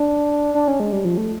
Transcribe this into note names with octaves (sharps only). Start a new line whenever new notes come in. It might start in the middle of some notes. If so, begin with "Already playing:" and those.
Already playing: D4
D4
C#4
G#3
G3
F3
A3